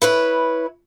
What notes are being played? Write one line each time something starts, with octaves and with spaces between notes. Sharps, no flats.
E4 B4 C#5